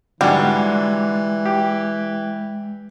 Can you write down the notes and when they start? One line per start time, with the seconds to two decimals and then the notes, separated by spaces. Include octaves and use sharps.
0.21 G#2 D3 E3 G3 G#3 F#4
1.46 G4